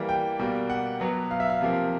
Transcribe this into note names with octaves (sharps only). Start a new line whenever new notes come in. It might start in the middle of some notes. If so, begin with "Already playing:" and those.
Already playing: E3 G3 A#3
G5
B2 G3 A#3
F#5
B2 F#3 B3
F5
E5
F5
C3 F3 A#3